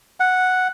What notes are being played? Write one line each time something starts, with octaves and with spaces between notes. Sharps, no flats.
F#5